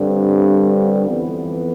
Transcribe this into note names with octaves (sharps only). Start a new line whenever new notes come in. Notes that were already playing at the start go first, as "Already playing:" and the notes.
Already playing: G2 D3 G3 C4
F2 E3 B3